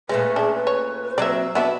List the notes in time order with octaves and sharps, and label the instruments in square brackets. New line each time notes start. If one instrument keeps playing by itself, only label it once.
[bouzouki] A#2 A3 C#4 [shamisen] G#3 [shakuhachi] B4
[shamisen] D4 [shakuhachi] G#4
[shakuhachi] B4
[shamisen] C#5
[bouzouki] F#3 A#3 C4 [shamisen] D5 E5
[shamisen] F#3 B3 D4 [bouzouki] D5 E5 F#5